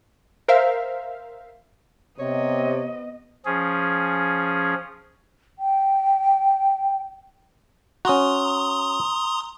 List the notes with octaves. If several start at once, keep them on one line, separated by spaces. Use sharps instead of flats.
A#4 C5 E5 F5
C3 B3 C#5 D#5
F3 C#4 G#4
G5
C#4 F#4 A#5 C6 D#6